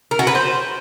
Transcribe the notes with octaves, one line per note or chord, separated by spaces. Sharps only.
A#4
F#4
B4
C5